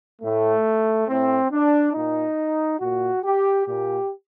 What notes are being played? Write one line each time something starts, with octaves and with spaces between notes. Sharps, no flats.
A2 A3
A2 C4
D4
A#2 D#4
A#2 F#4
G4
A#2 G4